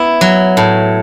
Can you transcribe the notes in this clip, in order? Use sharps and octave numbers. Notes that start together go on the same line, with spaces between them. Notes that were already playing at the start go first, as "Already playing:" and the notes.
Already playing: B3 E4
F#3
A2